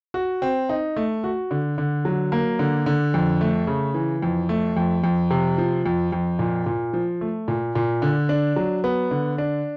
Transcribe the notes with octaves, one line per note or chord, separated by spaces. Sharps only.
F#4
C4
D#4
A3
F#4
D3
D3
F#3
A#3
D3
D3
F2
A3
C#3
E3
F2
A3
F2
F2
C3
F3
F2
F2
A#2
A#2
F3
A3
A#2
A#2
D3
D4
F#3
B3
D3
D4